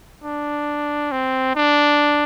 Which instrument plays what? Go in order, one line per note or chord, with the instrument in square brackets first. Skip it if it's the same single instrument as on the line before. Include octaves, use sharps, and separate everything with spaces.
[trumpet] D4
C4
D4